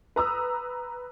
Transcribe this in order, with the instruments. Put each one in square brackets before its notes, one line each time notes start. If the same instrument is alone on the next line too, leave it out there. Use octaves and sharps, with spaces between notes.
[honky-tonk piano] B4 A#5 D#6 E6